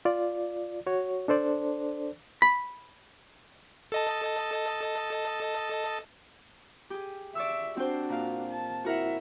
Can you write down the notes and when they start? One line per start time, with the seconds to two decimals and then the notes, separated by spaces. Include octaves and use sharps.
0.05 F4 D5
0.87 F#4 C#5
1.28 D4 A4 C5 D5
2.42 B5
3.92 A4 D#5 A5
6.90 G4 G#4
7.35 D5 E5 C#6 E6
7.77 C4 D4 F#4 C5
8.09 A#2 F5
8.50 A5
8.84 E4 F#4 A#4 E5 F#5